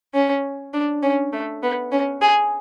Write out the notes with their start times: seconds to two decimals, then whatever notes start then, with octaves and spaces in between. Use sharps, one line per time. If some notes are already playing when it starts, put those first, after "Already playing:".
0.14 C#4
0.73 D4
1.02 C#4
1.33 A3
1.63 B3
1.92 C#4
2.21 G#4